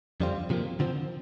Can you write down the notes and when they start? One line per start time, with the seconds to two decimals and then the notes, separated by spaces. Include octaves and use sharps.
0.21 F2 D3 G3 C4 F4
0.50 C3 F3 A#3
0.80 D3 F3 C4